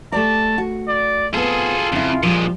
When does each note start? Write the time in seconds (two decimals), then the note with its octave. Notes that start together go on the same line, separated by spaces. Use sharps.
0.12 A3 G4 D5 A5
0.58 F#4
0.88 D5
1.34 B3 C4 F4 G#4 A4
1.92 F2 C#3 E4
2.23 A#2 F3 G3 G#3